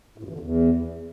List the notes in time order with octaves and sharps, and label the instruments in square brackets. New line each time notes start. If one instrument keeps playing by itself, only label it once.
[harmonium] A2
G2
E3
D3
E2